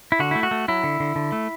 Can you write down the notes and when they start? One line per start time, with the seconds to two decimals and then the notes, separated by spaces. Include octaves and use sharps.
0.12 E4
0.19 D3 F#4
0.31 A3 E4
0.43 F#4
0.51 A3
0.68 F#3 E4
0.84 D3
1.00 D3
1.16 D3
1.32 A3